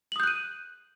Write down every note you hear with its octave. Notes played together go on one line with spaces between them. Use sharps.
D#6 F#6 G6 D#7 F#7